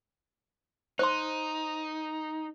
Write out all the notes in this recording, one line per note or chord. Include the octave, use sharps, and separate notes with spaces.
D#4 C5 C6